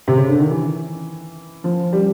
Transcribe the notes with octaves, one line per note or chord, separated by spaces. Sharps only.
C3
C#3
D3
D#3
E3
F3
G3